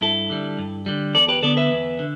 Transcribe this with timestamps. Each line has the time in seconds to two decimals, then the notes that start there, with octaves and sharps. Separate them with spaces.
0.01 G2 E4 A4
0.30 D3 G3
0.59 G2
0.86 D3 G3
1.15 E2 A4 D5
1.28 G4 B4
1.43 D3 B3 A4 D5
1.57 B4 E5
1.71 E2
1.99 D3